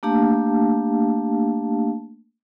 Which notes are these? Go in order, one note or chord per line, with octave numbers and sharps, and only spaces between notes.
A3 A#3 D4 G4 F5 A5